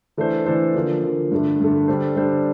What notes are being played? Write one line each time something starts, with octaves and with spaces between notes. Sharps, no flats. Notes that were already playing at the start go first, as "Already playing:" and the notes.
E3 A3 D4 A4 C5
E3 A3 D4 A4 C5
D3 F3 A#3
D3 F3 A#3
G2 D3 A3
G2 D3 A3
D3 G3 D4 A4 C5
D3 G3 D4 A4 C5